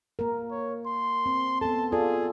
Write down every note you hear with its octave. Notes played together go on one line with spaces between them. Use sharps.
A#3 A#4
C#5
C6
C4
B3 A4 A5
F4 G#4 A4 D5